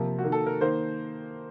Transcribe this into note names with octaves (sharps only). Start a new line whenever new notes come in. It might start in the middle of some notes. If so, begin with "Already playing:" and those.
Already playing: C3 F3 A#3 A#4
F#4
D#3 A#3
A4
A#4
D#3 A#3 C5